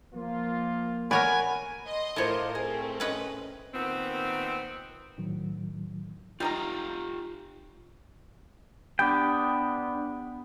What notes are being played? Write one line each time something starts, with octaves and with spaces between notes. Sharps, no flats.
F3 A#3 F4
A#4 C#5 D5 F#5 G#5 B5
D#5 C6
A2 D4 F4 A#4 C5 C#5
A3 C4 G#4
C#4 B4 D#5
A#2 D#3 B3 C4
A2 D#3 F#3
G3 D#4 F4 G4 A#5
B3 D4 G4 G5